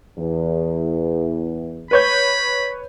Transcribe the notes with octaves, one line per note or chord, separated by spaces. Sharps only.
E2
B4 C#5 B5 G6